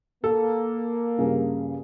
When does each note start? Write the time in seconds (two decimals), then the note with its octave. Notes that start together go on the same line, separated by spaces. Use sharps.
0.24 A#3 A4
1.18 G2 C#3 C#4